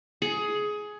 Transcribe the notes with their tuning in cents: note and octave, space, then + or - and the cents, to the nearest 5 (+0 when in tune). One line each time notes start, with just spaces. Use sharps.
G#4 +15